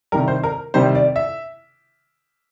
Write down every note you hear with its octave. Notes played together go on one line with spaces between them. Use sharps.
C3 D#3 G3 A#4
C5
A#4
C3 D#3 G3 C5
D5
E5